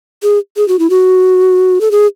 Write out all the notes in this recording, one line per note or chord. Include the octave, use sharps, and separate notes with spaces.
G#4
G#4
F#4
E4
F#4
A4
G#4